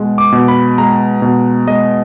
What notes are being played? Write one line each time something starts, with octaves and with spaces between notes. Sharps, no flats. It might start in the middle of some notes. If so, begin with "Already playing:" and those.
Already playing: B2 G#3
D6
B2
B5
G#3 A#5
B2
G#3 D#5